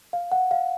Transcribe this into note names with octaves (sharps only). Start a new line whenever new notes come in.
F5
F#5
F5